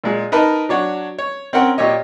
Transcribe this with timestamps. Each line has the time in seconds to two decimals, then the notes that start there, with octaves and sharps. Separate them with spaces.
0.04 A#2 G#3
0.32 D#4 A#4 B4 D#5 A5
0.69 F#3 D4 C#5 F#5
1.18 C#5
1.53 C4 C#4 A#4 F#5 G5
1.78 A#2 G4 C#5 D#5